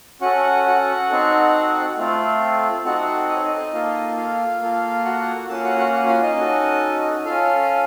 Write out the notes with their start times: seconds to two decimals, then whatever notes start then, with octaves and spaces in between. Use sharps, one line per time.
0.21 C#4 F#4 A4 F#5
0.65 F#4 F#5
1.10 C4 D#4 A4
1.98 A3 C4 F4 A4
2.85 C4 D#4 F#4 A4 F#5
3.29 D#5
3.36 C#5
3.44 D#4 D#5
3.73 A#3 F4 A4
4.17 F4 F5
4.61 A#3 F4 A4
5.05 F#4 F#5
5.48 A#3 C#4 F4 A4 A5
5.64 F#4 F#5
5.78 F#4 F#5
5.92 F#4 F#5
6.07 F4 F5
6.22 D#4 D#5
6.37 C#4 F#4 A4
7.25 C#4 F4 A4 F5